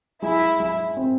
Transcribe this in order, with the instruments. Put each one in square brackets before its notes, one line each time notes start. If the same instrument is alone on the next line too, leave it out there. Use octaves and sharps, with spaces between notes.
[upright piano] G#3 [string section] E4
[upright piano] G#3
C4